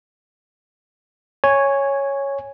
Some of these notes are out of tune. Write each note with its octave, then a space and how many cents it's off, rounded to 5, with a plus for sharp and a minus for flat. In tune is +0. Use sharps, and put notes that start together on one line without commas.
C#5 +0 G#5 -10